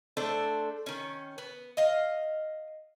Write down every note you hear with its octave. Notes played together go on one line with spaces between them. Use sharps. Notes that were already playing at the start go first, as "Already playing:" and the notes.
A3 D4 A4 C5
D#3 C#4
B3
D#5 F5